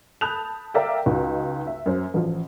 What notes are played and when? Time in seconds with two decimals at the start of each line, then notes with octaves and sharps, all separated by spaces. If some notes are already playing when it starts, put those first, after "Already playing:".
0.21 A5 B5 D#6 F#6 G6 F7
0.74 A#4 D5 E5 F5 G5
1.06 C#2 D#4 F#4
1.67 E5
1.86 F#2 C5
2.14 A1 F3